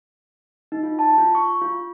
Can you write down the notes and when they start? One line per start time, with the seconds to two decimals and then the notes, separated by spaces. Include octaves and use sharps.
0.72 D#4
0.83 F4
0.99 A5
1.18 F4
1.35 C#6
1.62 F4